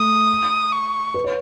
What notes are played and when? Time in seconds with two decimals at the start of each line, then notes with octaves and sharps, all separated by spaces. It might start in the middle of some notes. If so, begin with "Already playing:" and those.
Already playing: A3 D#6
0.72 C#6
1.14 B4
1.24 C#5